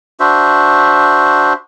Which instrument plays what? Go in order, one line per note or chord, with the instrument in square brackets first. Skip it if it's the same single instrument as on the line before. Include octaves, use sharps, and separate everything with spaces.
[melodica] D4 F#4 C5 E5